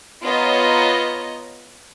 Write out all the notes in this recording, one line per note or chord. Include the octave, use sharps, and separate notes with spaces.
B3 F4 C#5 D#5 A#5